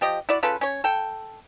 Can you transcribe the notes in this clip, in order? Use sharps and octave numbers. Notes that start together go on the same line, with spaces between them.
F3 G4 D#5
E4 F#4 D5
C#3 F4 A4 B4
C#4 C#5
A4 G5